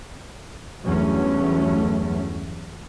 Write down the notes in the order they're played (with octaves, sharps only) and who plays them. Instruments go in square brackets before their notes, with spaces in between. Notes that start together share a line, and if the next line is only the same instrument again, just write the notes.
[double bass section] E2 G2 F#3 A3 C#4